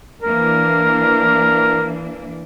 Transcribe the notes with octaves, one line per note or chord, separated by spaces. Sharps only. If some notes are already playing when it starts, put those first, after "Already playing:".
E3 A#3 D4 A#4